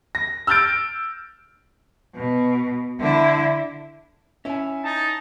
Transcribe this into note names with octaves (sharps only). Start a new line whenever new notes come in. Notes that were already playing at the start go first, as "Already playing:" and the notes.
A#6
E6 F6 G6 A6 D7
B2
D3 E4
C#4 E4 E5 G#5
D#4 A5